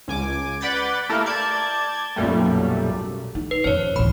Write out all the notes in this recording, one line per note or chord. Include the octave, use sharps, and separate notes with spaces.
C#2 G#5 D6
B4 D5 F#5 B5 G6 A6
A3 A#3 E4 G4 A4 A#4
D5 A5 G6 G#6
B1 F#2 A#2 G3 A3
D#4
B4
F2 C#4 C5 C#5
A1 D2 B5